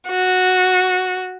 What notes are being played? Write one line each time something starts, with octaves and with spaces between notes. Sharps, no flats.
F#4